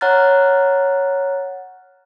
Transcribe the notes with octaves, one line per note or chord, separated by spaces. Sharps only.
C#5 F#5 A#5 F6 F#6 A6